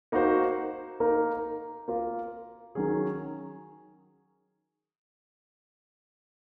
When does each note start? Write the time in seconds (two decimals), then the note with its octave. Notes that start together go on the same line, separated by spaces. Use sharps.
0.12 A#3 D#4 F#4 C5
1.00 A#3 D#4 A#4
1.88 A#3 F4 A#4
2.75 D#3 F#3 C#4 G#4